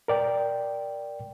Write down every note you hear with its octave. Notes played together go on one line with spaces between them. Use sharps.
A#4 D5 G5